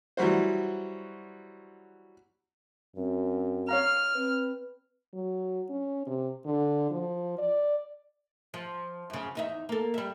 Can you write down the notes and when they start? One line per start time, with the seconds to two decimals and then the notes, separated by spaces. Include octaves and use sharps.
0.17 E3 F#3 G3 F#4 C5
2.96 F#2 C4
3.69 C#5 F5 A#5 F6
4.15 C4 B4
5.13 F#3
5.70 C#4
6.07 C3
6.45 D3
6.90 F3
7.38 D5
8.54 F3
9.10 F#2 C#3
9.35 E2 D#4 E5
9.69 A#3 A4
9.94 G3 E5